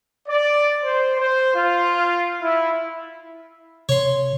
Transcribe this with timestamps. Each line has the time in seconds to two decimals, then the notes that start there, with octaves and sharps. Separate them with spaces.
0.28 D5
0.84 C5
1.19 C5
1.56 F4
2.42 E4
3.89 C3 C#5 C6